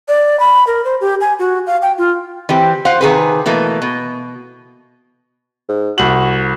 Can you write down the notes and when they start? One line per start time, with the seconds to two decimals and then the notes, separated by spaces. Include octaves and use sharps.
0.08 D5
0.40 B5
0.67 A#4
0.85 C5
1.01 G4
1.21 G#5
1.39 F#4
1.67 F5
1.82 G5
1.98 F4
2.49 E3 C4 G4
2.85 F4 C5 F5 F#5
3.01 C3 D#3 G#4 B4
3.46 B2 E3 A3 A#3
3.82 B2
5.69 G#2
5.98 C2 F#4 F#7